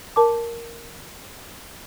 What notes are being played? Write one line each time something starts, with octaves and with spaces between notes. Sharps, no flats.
A#4 A5 D6